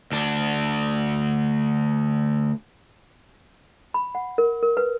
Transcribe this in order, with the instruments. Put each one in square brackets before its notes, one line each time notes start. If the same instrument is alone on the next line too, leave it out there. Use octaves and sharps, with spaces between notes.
[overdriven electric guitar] D2 D4
[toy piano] B5
F#5
A#4
A#4
B4